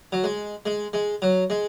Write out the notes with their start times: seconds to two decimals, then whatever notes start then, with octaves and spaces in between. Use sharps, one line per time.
0.12 F#3
0.24 G#3
0.66 G#3
0.93 G#3
1.22 F#3
1.50 G#3